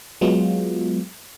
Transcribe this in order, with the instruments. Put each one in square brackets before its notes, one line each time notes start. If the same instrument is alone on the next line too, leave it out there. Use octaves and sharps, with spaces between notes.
[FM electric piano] F#3 G#3 B3 F4